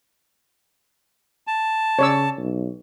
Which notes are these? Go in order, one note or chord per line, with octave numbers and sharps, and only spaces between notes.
A5
C#3 C#5 D5 E6
B1